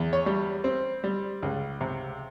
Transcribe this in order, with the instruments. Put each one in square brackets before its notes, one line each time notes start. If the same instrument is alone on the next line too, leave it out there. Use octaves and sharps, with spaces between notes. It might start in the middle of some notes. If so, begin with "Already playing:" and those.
Already playing: [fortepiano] E2
C#5
G3
C4
G3
C#2
C3